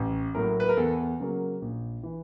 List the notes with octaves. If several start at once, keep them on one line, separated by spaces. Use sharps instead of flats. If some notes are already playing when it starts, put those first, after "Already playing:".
Already playing: A1
A2 F#3 A#3 A#4
B4
A#4
E2 A4
C#3 F#3 A#3
A#1
E3